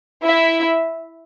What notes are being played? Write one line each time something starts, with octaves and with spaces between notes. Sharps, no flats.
E4 E5